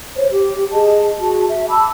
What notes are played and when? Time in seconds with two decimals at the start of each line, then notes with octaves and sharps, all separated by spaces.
0.16 C5 C#5
0.31 G4
0.72 G#4 D#5 A5
1.20 F#4 G#4 A5
1.50 E5
1.69 A5 B5 D6 E6